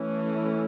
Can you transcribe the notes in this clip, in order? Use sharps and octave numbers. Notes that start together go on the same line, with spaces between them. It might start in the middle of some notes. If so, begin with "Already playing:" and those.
Already playing: E3 A3 C#4